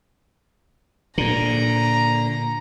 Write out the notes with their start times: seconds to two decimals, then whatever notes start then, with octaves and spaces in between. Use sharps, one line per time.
1.18 A#2 D3 A#5